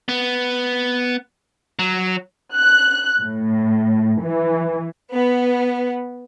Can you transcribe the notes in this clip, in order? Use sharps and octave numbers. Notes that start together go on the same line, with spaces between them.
B3
F#3
F#6
A2
E3
B3